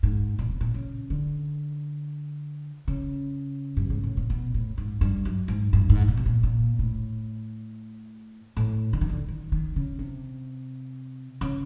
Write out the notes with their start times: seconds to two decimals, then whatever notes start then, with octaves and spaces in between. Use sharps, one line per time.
0.03 G#2
0.39 A#2
0.49 B2
0.61 A#2
0.74 C#3
1.10 D3
2.88 C#3
3.77 G2
3.90 G#2
4.04 A2
4.17 A#2
4.30 B2
4.54 A2
4.78 G#2
5.01 G2
5.25 F#2
5.48 G#2
5.73 G2
5.90 G#2
6.08 A#2
6.17 B2
6.26 A#2
6.43 A#2
6.79 A2
8.57 A2
8.93 D3
9.01 D#3
9.09 D3
9.28 D#3
9.52 D#3
9.76 C#3
9.99 C3
11.41 C#3